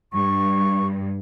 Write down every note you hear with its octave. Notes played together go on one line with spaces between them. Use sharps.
G2 C#6